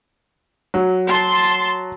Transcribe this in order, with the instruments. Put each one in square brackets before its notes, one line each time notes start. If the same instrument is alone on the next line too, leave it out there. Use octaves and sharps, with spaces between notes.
[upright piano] F#3
[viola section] A5 C6